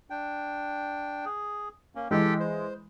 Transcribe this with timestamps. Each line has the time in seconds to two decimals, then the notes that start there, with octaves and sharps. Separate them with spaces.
0.10 D4 G5
1.25 G#4
1.95 A#3 C#4
2.11 E3 G#3 G4 A4 G5
2.40 C5